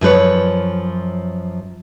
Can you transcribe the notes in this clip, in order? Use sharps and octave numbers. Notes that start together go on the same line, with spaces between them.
F#2 F3 B4 C#5